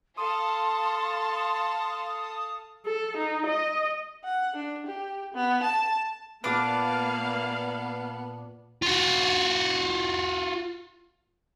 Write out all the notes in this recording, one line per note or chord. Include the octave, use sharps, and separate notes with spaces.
A4 F5 A5 C6 D#6
A4
D#4
D#5
F#5
D4
G4
B3
A5
A#2 A#3 B3 D4 B4 F5 D6
F4 F#4